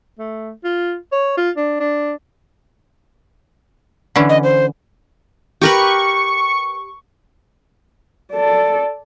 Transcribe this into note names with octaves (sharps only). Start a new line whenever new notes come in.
A3
F4
C#5
F4
D4
D4
D3 E3 C#4
D#5
C5
G4 A#4 B4 C#6
A4 D5